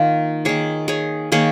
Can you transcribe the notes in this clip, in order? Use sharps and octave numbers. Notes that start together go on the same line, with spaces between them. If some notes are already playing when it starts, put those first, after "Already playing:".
Already playing: D#3 A#3 F4
D#3 A#3 G#4 C#5
G#4 C#5
D#3 A#3 G#4 C#5